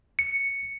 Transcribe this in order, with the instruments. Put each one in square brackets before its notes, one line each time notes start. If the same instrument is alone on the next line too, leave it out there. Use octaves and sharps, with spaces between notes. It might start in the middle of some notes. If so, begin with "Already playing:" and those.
[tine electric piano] C#7